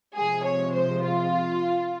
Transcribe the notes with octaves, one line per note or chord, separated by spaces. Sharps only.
C3 F3 G#3 G#4
C#5
C5
F4